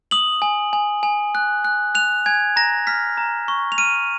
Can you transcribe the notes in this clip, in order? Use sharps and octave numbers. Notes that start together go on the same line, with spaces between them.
D#6 F#7
G#5
G#5
G#5
F#6
F#6
F#6 F7
G#5 G#6
A#5 A#6
F6 B6
A#5
C#6
F7
F6 D#7